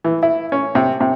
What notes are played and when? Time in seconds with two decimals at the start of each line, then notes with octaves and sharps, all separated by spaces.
0.04 E3
0.23 E4
0.52 C#4
0.75 C3
1.00 C3